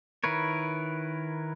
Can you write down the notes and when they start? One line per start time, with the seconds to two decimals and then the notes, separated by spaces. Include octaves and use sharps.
0.24 D#3 E4 A#4 B4 C#5